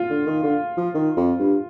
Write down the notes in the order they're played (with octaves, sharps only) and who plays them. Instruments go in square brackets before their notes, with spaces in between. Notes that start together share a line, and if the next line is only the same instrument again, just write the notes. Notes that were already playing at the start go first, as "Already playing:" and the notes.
Already playing: [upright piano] F4
[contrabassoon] D3
D#3
D3
F3
D#3
F2
G2